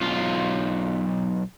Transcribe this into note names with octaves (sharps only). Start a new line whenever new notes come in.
B1 F4